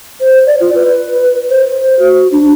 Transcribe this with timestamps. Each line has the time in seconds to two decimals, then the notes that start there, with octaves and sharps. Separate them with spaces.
0.20 C5
0.46 D5
0.60 F4
0.75 B4
1.50 C5
1.99 F#4
2.32 D4